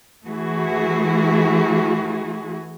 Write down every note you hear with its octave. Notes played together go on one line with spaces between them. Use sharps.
E3 A3 E4 F#4 G#4